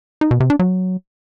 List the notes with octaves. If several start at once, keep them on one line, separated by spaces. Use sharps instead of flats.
D#4
B2
C3
D4
F#3